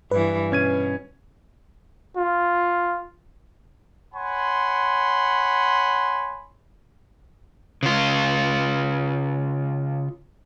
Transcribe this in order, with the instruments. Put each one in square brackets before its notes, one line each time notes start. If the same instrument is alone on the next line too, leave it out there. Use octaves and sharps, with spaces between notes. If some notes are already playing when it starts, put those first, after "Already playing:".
[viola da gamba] G2 E3 [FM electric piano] B4
[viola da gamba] B2 [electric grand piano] C#4 G#6 D#7
[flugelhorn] F4
[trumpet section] C#5 F#5 G#5 B5 C6
[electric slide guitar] C#3 F4